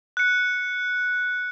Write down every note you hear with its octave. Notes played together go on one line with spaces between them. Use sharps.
F#6 C#7